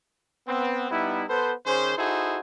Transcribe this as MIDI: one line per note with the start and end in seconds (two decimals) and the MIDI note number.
0.47 0.86 59
0.47 0.86 60
0.91 1.23 55
0.91 1.23 59
0.91 1.23 63
0.91 1.23 64
1.29 1.52 59
1.29 1.52 69
1.29 1.52 71
1.29 1.52 72
1.66 1.94 51
1.66 1.94 61
1.66 1.94 68
1.66 1.94 72
1.97 2.39 63
1.97 2.39 64
1.97 2.39 66
1.97 2.39 68
1.97 2.39 69
1.97 2.39 72